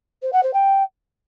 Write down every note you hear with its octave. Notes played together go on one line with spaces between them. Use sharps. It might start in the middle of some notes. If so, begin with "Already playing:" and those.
C5
F#5
C5
G5